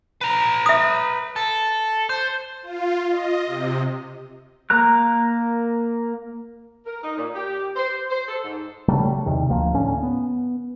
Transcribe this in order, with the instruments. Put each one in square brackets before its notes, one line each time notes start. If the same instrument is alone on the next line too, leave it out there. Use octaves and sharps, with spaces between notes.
[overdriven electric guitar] B4 A#5
[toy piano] E5 D#6
[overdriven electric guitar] A4
C5
[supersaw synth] F4
D#5
C3
[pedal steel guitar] A#3 A#4 A#5 F#6
[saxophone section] A#4
D#4
A#2
G4
C5
C5
A4
G#2
[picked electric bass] C#3 F#3 G3 A3
E2 C3 D#3
D2 F3 A#3
D2 A2 D3 C#4
B3